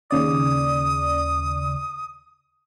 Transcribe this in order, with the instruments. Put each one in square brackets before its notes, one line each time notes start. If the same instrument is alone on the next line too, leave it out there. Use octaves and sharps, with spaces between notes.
[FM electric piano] D#2 C#3 D5 [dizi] D#6